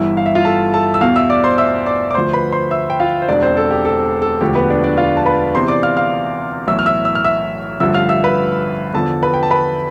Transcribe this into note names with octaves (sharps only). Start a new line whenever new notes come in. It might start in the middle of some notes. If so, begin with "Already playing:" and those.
Already playing: G1 G2 E3 E4 E5
F5
E5
F4 F5
A4 A5
A4 A5
E6
E2 B2 F5 F6
E5 E6
D5 D6
C5 C6
E5 E6
D5 D6
D6
D2 D3 F3 C5 C6
B4 B5
C5 C6
E5 E6
G5
F4 F5
C5
E1 E2 B2 D4 D5
C4 C5
A4
G4
A4
A4
E1 D2 D3 F3 G4
B3 B4
D4 D5
D4 D5
F4 F5
A5
B4 B5
E2 C3 E3 C5 C6
D5 D6
F5 F6
F5 F6
B1 A2 E3 E5 E6
F6
E5 E6
E6
F6
E5 E6
A1 G2 D3 F3 E5 E6
F5 F6
E5 E6
B4 B5
E2 D3 F3 A4 A5
B4 B5
G5
A5
B4 B5